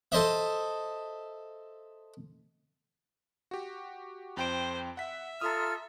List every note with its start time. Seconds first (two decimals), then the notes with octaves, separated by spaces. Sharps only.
0.12 A4 C5 D#5 E5
3.51 F#4 G4
4.37 F2 C5 G5 D7
4.97 E5 F#5 B6
5.41 F4 A4 A#5 D#6 F6